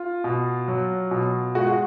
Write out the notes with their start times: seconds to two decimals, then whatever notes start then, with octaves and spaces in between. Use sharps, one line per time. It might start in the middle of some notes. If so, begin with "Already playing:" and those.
Already playing: F4
0.24 B2
0.68 F#3
1.11 B2
1.55 G#3 F#4
1.67 F#4